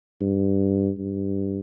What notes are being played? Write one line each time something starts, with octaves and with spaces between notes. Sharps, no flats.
G2
G2